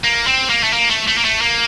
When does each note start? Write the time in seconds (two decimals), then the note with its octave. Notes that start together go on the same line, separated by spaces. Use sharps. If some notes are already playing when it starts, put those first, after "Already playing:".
0.04 A#3
0.27 C4
0.49 A#3
0.63 A3
0.73 A#3
0.90 A3
1.07 A3
1.17 A#3
1.25 A3
1.41 A#3